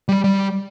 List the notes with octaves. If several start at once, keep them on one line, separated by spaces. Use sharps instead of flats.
G3
G3